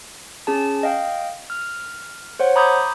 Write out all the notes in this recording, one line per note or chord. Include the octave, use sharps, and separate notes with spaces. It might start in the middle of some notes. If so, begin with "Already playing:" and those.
C#4 G#4 A5
D#5 F5 G5
F6
C5 C#5 F#5
A#5 B5 D6 D#6 G6 G#6